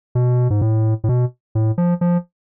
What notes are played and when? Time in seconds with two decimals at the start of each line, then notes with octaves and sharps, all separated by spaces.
0.15 B2
0.50 G#2
0.61 A2
1.04 A2
1.09 B2
1.55 A2
1.78 F3
2.01 F3